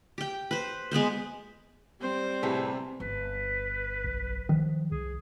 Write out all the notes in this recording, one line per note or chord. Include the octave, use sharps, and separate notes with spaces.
G4 G5
B4 C5
G#3 B3 B4 C5
G3 C4 C5
A2 C3 G#4 B4
G1 B4
B1
D#3 F3
C2 G#4